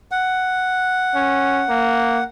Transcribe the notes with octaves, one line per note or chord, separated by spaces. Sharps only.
F#5
C#4
A#3